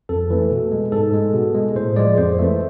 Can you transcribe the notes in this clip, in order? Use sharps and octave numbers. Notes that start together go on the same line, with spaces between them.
F2 A4
E3 A3
B2
G#3
G#2 A4
G#3
B2
G#3
A2 C5
F3 G#3 D5
F2 C5
E3 A3